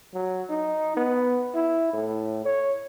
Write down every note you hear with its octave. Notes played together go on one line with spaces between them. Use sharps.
F#3
D#4
B3
E4
A2
C#5